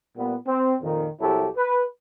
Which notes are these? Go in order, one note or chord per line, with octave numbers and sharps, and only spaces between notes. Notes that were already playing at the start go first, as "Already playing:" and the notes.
A#2 G3 B3
C4
F2 A#2 D#3
C2 F#3 E4 G4 A4
B4